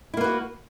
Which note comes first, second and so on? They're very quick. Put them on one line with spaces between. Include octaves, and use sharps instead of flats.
E4 A#3 B4 F#4